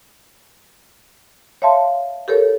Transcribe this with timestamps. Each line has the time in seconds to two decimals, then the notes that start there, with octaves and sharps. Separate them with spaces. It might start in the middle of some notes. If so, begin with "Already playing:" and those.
1.62 C#5 E5 F5 A5 C6
2.28 G4 A4 A#4 C#5